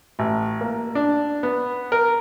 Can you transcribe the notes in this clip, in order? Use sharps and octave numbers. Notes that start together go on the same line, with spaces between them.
A1
A#3
D4
B3
A#4